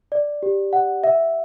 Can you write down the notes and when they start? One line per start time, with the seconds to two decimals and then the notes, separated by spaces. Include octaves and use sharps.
0.12 D5
0.43 G4
0.73 F#5
1.04 E5